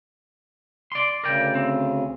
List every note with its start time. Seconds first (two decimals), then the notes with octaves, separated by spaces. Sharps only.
0.92 D5 C6
1.24 D2 C#3 A#4 D5 G5
1.55 C4